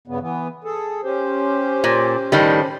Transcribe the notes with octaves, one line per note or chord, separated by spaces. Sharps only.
G2 C#3 B3
E3 B3
G#4 A4
C#4 G4 C5
A#2
A2 D#3 G3